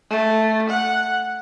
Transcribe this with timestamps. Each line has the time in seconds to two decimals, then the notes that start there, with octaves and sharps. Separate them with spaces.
0.10 A3
0.70 F#5